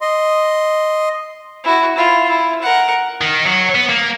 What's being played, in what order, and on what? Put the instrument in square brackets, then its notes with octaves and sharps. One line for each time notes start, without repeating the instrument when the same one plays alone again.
[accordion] D#5 C6
[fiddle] E4 F#4
E4 F4
E4
A#4 F#5
[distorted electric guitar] D#3
F#3
B3
A#3